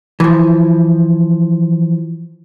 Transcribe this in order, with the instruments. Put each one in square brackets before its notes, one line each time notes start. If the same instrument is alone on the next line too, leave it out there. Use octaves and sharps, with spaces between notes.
[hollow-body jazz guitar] E3 F3